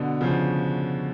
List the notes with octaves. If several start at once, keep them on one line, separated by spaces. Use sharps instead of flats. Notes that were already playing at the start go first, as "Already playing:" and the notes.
Already playing: B2 D3
C#3 F3